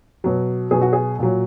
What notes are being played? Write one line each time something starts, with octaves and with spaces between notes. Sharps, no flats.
B2 F#3
B2 F#3 G#4
F#4
G#4
A#2 F#3